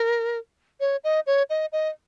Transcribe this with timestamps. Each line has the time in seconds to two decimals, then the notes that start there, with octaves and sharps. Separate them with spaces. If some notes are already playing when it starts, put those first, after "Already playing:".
Already playing: A#4
0.80 C#5
1.04 D#5
1.27 C#5
1.50 D#5
1.72 D#5